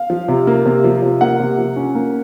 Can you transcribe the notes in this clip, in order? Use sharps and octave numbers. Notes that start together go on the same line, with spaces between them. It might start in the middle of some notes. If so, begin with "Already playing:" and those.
Already playing: F5
F3
C3
A#3
C3
F3
C3
A#3 F#5
C3
F3
C#4
A#3